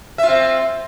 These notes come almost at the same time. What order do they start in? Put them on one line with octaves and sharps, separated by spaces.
E5 F4 C4